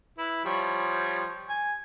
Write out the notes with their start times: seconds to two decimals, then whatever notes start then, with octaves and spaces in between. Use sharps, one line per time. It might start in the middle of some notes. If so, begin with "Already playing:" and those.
0.18 E4 B4
0.45 F3 G3 C#5
1.49 G#5